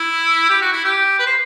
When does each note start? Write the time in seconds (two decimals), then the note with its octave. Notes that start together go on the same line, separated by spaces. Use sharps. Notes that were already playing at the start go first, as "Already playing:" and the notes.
Already playing: E4
0.49 G4
0.61 F#4
0.72 E4
0.84 G4
1.19 B4
1.26 C5